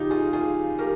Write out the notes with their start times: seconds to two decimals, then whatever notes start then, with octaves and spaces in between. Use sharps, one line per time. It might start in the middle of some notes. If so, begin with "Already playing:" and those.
Already playing: C#3 F3 D#4 F4 G4
0.11 F4 G#4
0.33 F4 G#4
0.78 G4 A#4